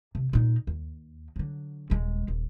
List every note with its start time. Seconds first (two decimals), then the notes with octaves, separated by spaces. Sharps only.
0.15 C3
0.33 A#2 D#4
0.67 D#2
1.36 D3 F#3
1.90 D#1 G#3
2.28 D#1